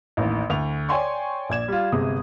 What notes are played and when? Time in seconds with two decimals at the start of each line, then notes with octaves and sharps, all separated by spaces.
0.17 A1 D#2 A2
0.50 D2 F7
0.89 C#5 D5 G5 G#5 C6 C#6
1.49 A#1 D5 G#6 E7
1.68 G3 F4
1.92 G1 C3 G#3 D#6